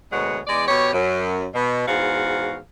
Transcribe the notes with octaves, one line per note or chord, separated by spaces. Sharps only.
D2 B2 G#3 C#5 F#5
E2 G#3 D5
B2 G4 C#5
F#2
B2
E2 G#2 F#4 F5